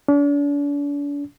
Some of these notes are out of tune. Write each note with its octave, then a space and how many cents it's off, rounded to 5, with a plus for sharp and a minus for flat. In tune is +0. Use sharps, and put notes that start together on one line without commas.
D4 -40